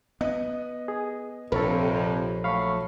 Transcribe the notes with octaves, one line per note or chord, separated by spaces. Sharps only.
B3 D#5
G#4
A#1 F2 C3 A4 A#4 C#5 B5
F#3 A3 F5 B5 C#6